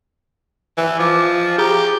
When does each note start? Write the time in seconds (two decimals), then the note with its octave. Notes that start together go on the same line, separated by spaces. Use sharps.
0.78 E3
0.99 F3 D6
1.58 G4 G#4 A#5